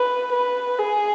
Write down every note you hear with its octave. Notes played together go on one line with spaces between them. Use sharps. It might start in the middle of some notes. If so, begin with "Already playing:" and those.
Already playing: B4
B4
G#4